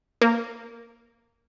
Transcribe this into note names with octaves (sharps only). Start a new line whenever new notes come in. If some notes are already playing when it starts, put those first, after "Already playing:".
A#3